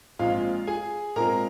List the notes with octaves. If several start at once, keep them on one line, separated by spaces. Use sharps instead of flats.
A#1 A#2 G#3 C4 F4 F5
G#4 G#5
A#2 G#3 C4 A#4 A#5